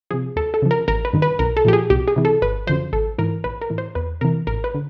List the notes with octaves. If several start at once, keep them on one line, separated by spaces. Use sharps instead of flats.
C3 F3 G#4
D#2 A4
A4
C#3 F3
A#4
A1 A#4
B4
G2 D#3
B4
B1 A#4
A4
A#2 F3 G4
G#4
C2 G4
G#4
C3 E3
A4
G#1 B4
F#2 D3 F3 C5
A1 A4
G#2 E3 A#4
A#1 B4
A#4
A2 E3
C5
E2 B4
C3 E3 A#4
A1 A#4
B4
D3